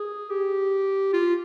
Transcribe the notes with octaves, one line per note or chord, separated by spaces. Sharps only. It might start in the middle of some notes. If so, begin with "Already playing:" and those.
Already playing: G#4
G4
F4